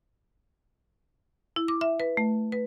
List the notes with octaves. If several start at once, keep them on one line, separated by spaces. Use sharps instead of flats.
E4
D6
E5
B4
A3
B4